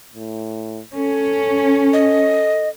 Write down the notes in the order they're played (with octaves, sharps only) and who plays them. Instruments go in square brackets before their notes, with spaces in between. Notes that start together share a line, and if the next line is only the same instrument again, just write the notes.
[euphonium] A2
[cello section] C#4 [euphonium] A4
[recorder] D#5